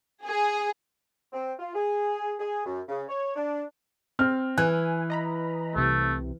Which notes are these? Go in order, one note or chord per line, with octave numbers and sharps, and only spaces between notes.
G#4
C4
F4
G#4
G#4
F#2
C#3
C#5
D4
C4 F6
E3 G#5 F#6
D#5 A#5 B5
C2 C3 A3